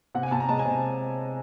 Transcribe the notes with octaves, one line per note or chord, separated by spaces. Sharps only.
C3 F#5
G#5
C3 A5
A#5
G#3 A5
G#5
C3